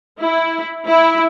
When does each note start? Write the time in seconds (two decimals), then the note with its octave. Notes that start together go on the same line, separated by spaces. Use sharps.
0.20 E4
0.87 E4